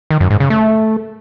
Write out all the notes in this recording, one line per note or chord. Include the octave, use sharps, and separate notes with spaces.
D#3
F#2
G#2
C#3
A3